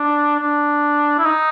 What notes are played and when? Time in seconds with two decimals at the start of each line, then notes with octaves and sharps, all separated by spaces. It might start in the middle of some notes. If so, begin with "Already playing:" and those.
Already playing: D4
0.40 D4
1.19 E4
1.26 D#4